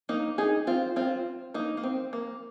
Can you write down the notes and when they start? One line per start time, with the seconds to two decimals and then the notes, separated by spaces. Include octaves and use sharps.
0.09 A#3 D#4
0.38 D#4 G#4
0.67 C4 F4
0.96 C4 F4
1.54 A#3 D#4
1.77 A#3
1.83 C4
2.13 A#3